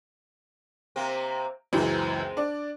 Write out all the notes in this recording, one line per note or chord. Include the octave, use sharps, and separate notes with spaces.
C3 A#3 C4
C#2 F#2 E3 G#3 C4
D4 D5